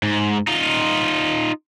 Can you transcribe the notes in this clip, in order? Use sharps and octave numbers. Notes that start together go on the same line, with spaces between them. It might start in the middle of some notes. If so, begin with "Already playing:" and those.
G#2
D#4 F4